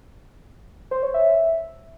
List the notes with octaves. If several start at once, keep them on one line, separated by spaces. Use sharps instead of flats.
C5
C#5
E5